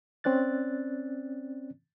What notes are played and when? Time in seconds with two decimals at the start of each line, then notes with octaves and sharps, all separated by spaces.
0.24 C4 C#4 D5 F#6 A6